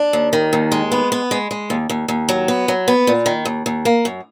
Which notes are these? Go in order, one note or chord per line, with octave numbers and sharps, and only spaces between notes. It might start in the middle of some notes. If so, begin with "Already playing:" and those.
Already playing: D4
D#2
D#3
D#2
G#3
B3
B3
G#3
G#3
D#2
D#2
D#2
F#3
B3
F#3
B3
A#2
D#3
D#2
D#2
A#3
F#2